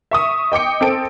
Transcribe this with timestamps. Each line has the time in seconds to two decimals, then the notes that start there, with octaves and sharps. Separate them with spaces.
0.11 E5 C#6 D#6
0.52 D#5 G5 D6 C#7
0.81 C4 A4 D7